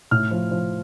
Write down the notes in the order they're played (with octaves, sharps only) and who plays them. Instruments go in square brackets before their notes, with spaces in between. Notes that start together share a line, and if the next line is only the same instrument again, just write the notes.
[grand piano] A2 F6
F3
F3